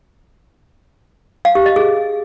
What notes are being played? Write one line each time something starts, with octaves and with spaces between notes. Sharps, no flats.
F5
G4
D#5
G#4